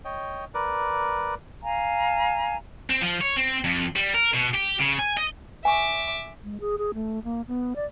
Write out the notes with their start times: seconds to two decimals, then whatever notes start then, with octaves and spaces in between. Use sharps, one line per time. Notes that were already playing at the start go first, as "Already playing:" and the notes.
0.05 C#5 D#5 G5
0.54 A#4 B4 D5
1.62 F5 G#5 A#5
2.90 C4
3.01 F3
3.21 C#5
3.36 C4
3.64 F2
3.96 G3
4.14 A#4
4.34 B2
4.55 G4
4.80 C#3
4.99 G#5
5.17 D#5
5.65 E5 G#5 C#6 D6
6.44 G#3
6.61 G#4
6.78 G#4
6.94 A3
7.24 A#3
7.48 B3
7.76 D5